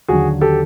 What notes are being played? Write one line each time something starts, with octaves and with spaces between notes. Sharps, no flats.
D#2 D3 F#3 F#4 G#4
G4 A4